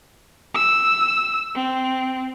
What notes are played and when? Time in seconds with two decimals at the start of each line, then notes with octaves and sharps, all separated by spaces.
0.54 E6
1.55 C4